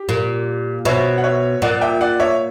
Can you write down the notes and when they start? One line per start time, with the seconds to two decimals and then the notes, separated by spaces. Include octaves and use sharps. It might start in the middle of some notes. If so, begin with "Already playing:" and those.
Already playing: G4
0.09 A#2
0.85 B2 C#5 E5
1.18 F#5
1.24 C#5 E5
1.62 A#2 D5 F#5
1.81 E5 G5
2.01 D5 F#5
2.20 C#5 E5